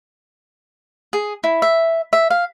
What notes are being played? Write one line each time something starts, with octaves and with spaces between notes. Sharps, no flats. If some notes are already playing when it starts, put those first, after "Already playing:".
G#4
E4
E5
E5
F5